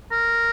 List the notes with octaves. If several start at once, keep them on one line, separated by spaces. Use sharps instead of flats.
A#4